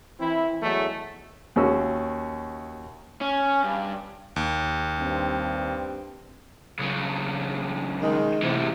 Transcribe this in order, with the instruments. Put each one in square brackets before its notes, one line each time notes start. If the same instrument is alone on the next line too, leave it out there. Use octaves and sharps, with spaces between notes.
[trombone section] E3 C4 E4
E2 F#3 G#3 A3
[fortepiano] D#2 A#3 C#4 F#4 E6
[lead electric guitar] C#4
G2
[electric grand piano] D#2
[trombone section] G2 C4
[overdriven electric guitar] B1 C#3
[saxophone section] D#3 G#3
[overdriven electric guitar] G#2 E3 [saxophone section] C3